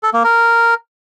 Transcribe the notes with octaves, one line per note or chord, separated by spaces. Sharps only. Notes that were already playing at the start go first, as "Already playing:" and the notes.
A4
A#3
A#4